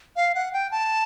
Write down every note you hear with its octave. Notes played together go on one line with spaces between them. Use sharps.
F5
F#5
G5
A5